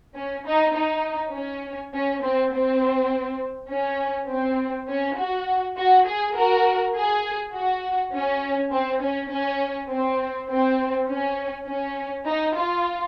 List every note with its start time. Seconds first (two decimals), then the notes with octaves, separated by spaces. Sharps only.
0.15 C#4
0.46 D#4
0.75 D#4
1.34 C#4
1.94 C#4
2.23 C4
2.52 C4
3.70 C#4
4.29 C4
4.89 C#4
5.18 F#4
5.77 F#4
6.07 G#4
6.36 F#4 A#4
6.95 G#4
7.54 F#4
8.14 C#4
8.72 C4
9.02 C#4
9.32 C#4
9.91 C4
10.50 C4
11.09 C#4
11.68 C#4
12.27 D#4
12.57 F4